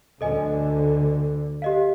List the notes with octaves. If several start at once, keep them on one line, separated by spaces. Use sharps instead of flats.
D2 D3 A4 D#5 G#5
G4 D#5 F5